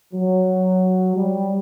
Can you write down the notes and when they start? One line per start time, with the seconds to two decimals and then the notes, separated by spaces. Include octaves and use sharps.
0.13 F#3
1.15 G3